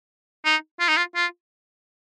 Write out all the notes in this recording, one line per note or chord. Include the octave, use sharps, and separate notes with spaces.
D#4
F4
D#4
F4
F4